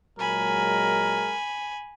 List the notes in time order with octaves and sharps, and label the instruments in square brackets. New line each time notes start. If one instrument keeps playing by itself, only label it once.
[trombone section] A#2 F#3 G#3 [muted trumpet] A#4 [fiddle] G#5 B5